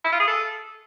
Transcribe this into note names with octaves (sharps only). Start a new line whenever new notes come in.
E4
F4
G#4
A4